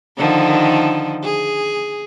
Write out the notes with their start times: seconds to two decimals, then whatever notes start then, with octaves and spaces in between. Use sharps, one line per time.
0.17 D3 D#3 F3
1.24 G#4